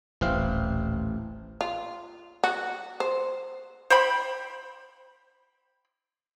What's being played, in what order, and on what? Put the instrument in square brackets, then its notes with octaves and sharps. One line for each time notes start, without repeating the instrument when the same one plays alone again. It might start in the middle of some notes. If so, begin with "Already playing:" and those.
[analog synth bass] D#1 [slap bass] A1 [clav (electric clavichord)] E3 C4 F5
[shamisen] F4
F#4
C5
[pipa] C5 G5 B5